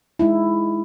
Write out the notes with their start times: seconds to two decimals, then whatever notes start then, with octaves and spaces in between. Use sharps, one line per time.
0.19 G#3 D#4 E4